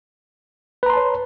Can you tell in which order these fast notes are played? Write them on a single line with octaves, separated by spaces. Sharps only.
B4 A#5 C6 A5 C#5